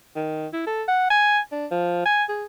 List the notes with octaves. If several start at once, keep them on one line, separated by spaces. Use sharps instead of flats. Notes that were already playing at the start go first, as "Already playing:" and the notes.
D#3
E4
A4
F#5
G#5
D4
F3
G#5
G#4